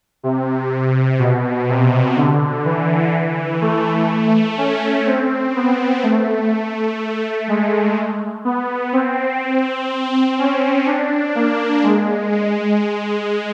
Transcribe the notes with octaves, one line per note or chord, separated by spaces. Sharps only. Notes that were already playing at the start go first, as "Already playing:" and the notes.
C3
B2
C3
D3
E3
A3
C#4
C4
B3
A3
G#3
B3
C4
C#4
D4
A#3
G#3
G#3